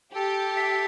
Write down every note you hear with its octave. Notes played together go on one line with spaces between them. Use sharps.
G4 A4
E5